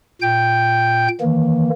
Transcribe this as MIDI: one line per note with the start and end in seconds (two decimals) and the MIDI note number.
0.22 1.08 46
0.22 1.08 79
0.22 1.08 91
1.21 1.70 51
1.21 1.70 52
1.21 1.70 58